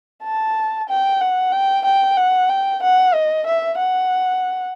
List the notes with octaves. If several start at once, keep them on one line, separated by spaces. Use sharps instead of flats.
A5
G5
F#5
G5
G5
F#5
G5
F#5
D#5
E5
F#5